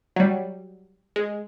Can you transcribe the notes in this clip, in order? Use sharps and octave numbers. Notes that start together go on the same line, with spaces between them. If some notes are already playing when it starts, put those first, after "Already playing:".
F#3 G3
G#3